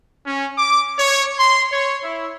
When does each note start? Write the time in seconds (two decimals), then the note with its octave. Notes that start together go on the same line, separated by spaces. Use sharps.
0.26 C#4
0.58 D6
0.99 C#5
1.39 C6
1.72 C#5
2.03 E4